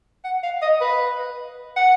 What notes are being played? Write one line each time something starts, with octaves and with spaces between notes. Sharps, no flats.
F#5
F5
D#5
B4
F#5